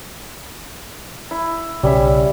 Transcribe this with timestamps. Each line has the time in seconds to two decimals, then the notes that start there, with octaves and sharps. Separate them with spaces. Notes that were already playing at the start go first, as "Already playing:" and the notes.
1.31 E4
1.83 B1 C#3 G3 C#4 E5